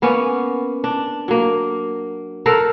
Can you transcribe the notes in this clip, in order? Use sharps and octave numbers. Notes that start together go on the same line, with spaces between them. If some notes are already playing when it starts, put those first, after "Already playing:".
A#3 B3 C#4
D4
F#3 A#3
A4 A#4 C5 F#5